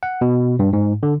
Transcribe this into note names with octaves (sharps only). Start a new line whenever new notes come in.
F#5
B2
G2
G#2
D3